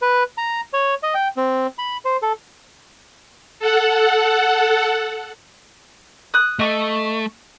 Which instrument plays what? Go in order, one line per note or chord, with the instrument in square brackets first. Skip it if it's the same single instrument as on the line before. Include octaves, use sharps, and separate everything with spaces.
[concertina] B4
A#5
C#5
D#5
G5
C4
B5
C5
A4
[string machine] A4 F#5
[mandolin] D#6 F#6
[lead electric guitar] A3 [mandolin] D#5 C#6